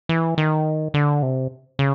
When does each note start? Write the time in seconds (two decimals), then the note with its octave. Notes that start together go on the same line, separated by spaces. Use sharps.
0.09 E3
0.38 D#3
0.94 D3
1.22 C3
1.79 C#3